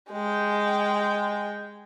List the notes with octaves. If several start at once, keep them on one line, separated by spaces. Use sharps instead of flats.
G#3 G5